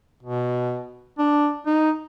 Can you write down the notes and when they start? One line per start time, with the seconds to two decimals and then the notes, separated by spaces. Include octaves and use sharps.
0.23 B2
1.19 D4
1.66 D#4